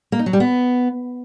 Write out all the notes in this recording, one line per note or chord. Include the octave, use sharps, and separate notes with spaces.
A#3
D#4
F#3
G3
B3